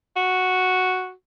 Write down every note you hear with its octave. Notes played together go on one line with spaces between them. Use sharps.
F#4